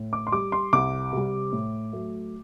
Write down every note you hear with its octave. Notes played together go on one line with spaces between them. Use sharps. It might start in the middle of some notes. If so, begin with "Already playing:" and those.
Already playing: A2
D6
C6
G3 D6
C6
C2 D6
C3 G3
A2
F#3 A3